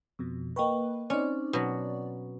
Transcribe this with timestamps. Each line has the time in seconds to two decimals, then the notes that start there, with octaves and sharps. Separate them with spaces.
0.19 F2 B2
0.56 A#3 B4 D#5 G5 C#6
1.10 C4 C#4 D#4 C5 D5
1.53 B2 F#3